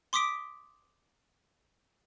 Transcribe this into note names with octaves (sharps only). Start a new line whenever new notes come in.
C6 D6 D#6 B6 D7